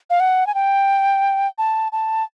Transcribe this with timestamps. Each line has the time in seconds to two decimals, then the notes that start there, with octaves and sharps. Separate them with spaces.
0.10 F5
0.20 F#5
0.47 G#5
0.54 G5
1.58 A5
1.92 A5